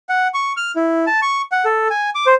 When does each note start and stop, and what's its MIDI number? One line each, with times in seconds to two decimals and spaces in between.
0.09 0.28 78
0.34 0.53 85
0.57 0.72 89
0.76 1.05 64
1.07 1.20 81
1.22 1.42 85
1.52 1.65 78
1.65 1.88 69
1.90 2.10 80
2.15 2.26 86
2.26 2.34 72